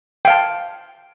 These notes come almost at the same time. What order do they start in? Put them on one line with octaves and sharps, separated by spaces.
G5 F5 A5